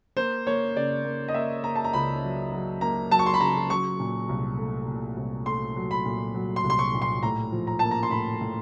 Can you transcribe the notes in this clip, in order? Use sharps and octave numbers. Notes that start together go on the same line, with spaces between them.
A#3 C5
A#3 C#5
C#3 D5
A#3
D#5
A#3 E5
A#3 A#5
A5
A#5
C#2 B5
F#3
F#3
A#3 A#5
F#3 A5
C#6
C6
B5
C#3 A#5
F#3 C#6
A#2
C2
A3
A#2
C2
A3 C6
F#3
B5
A#2
F#3
C6
C2
C6
C#6
A#2
C6
A2 A#5
F3
A#5
A#3 A5
A#5
C6
A2 B5
A2